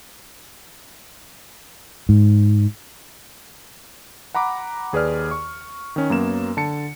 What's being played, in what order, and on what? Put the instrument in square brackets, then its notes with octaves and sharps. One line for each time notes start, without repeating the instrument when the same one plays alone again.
[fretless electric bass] G#2
[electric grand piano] F#5 A#5 B5 D6
D#2 G#4 B4 D5 F6
C#6
D#3 C#4
F#2 F#3 A#3 B3 E7
D3 A5 C#7